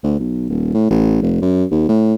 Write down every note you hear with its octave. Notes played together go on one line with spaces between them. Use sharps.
D2
B1
D#1
A2
A1
F1
F#2
D#2
A2